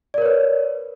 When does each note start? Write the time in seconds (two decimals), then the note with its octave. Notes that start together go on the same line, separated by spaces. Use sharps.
0.14 D5
0.18 A#4
0.22 C#5
0.26 B4